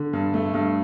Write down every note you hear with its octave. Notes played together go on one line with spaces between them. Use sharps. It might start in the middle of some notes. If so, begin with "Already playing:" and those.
Already playing: D3
G2
A3
G2